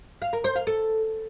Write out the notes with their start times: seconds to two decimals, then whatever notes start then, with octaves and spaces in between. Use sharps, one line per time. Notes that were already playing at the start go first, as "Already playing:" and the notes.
0.22 F5
0.33 A#4
0.44 C5
0.56 F5
0.67 A4